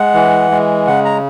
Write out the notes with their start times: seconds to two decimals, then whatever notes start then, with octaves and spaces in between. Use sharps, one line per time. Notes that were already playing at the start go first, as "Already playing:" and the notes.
Already playing: G#3 F#5
0.14 E3
0.51 G#3
0.87 C#3 F#5
1.05 A#5